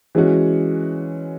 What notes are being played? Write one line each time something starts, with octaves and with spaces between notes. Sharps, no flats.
E3 G#3 C#4 F#4